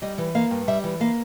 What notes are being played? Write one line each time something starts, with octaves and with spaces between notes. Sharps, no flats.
G3 D#5
E3
A#3 F5
G2
G3 E5
E3
A#3 F5